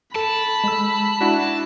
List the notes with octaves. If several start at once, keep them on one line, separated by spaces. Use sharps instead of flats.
A4 A5 B5
G#3 E6
D4 E4 F#4